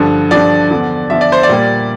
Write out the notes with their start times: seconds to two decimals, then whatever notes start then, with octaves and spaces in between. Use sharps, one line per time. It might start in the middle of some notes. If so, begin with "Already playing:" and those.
Already playing: G2 D3 F3
0.31 G2 D3 F3 D5
0.70 E2 D3 F3
1.09 E2 D3 F3 E5
1.21 D5
1.32 C5
1.43 D5
1.49 A#2 G3 A#3